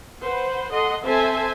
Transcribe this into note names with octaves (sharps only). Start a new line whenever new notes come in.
B4 C5 F#5
A4 D#5 F#5 C6
C4 A4 C5 E5 G#5 A5